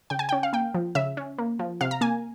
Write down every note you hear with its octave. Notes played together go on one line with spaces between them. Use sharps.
C#3 G5
G#5
C#4 G5
F5
A#3 G5
F3
C#3 E5
C#4
A#3
F3
C3 F5
A#5
A#3 G#5